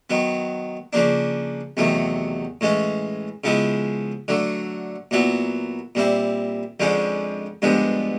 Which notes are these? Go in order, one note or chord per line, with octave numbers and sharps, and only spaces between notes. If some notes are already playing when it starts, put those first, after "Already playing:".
D#3 F#3 B3
C#3 F3 A#3 D4
E2 C3 D#3 F#3 A3
A2 E3 G#3 C#4
C#3 F3 G#3 B3 E4
D3 F#3 A3
A#2 F#3 B3 E4
A#2 G3 C4 E4
F2 D3 F3 G#3 C#4
G2 D3 F3 G#3 B3